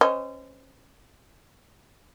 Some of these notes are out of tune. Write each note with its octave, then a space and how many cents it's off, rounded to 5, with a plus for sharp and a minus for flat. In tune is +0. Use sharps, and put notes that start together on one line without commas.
C#4 -25 C5 -35 D#5 +0